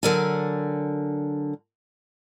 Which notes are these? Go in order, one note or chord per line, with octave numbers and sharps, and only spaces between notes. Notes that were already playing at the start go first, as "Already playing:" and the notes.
D3 F#3 A#4 D5 G#5